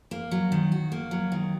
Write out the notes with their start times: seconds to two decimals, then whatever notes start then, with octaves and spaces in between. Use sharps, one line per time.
0.11 A#3
0.31 F#3
0.52 D#3
0.72 F#4
0.92 A#3
1.11 F#3
1.32 D#3